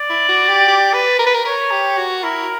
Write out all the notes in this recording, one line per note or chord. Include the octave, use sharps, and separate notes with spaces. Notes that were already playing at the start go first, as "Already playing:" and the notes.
Already playing: D5
E4
F#4
G4
G4
B4
A#4
B4
A#4
A#4 C#5
G4
F#4
E4 A#4